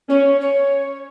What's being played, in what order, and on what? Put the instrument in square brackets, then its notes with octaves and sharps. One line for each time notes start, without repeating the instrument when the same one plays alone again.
[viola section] C#4 [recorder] C#5
[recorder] C#5